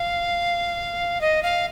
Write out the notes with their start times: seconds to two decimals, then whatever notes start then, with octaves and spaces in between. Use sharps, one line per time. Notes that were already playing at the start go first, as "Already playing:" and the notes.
Already playing: F5
1.21 D#5
1.43 F5